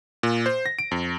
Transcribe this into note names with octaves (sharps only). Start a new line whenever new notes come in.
A#2
C5
A#6
D7
F2